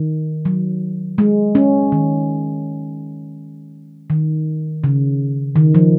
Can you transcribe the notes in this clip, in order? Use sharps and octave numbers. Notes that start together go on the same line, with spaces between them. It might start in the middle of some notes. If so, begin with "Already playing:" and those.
Already playing: D#3
F#3
G#3
C#4
D#3
D#3
C#3
D#3
F3